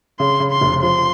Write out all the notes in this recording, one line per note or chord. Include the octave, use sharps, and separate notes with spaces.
C#3 C6
C#3
C6
F1
F3 C6